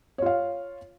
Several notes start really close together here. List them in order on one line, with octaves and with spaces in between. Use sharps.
C#5 F4 F5